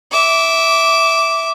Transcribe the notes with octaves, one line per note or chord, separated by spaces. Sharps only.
E5 D6